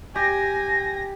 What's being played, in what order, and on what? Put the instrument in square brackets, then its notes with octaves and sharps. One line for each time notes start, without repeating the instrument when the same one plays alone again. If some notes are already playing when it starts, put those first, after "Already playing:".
[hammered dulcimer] G4 [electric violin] G#5 [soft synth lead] A#6